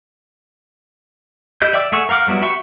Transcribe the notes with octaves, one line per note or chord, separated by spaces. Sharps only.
E4 G4 D#5 G6
D5 E5 G5 D6 E6
A3 G#4 E5 F#5 C#6
A#4 F5 F#5 D6 F6
F#3 G3 B3 E4 F#4
F#4 G4 E5 B5 C#6